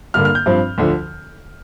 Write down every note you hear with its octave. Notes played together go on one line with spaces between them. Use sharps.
G2 D3 A#3 F6
F6
G6
G2 F3 C4
D2 D3 F3